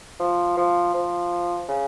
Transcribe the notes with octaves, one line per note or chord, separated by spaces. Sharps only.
F3
F3
F3
C#3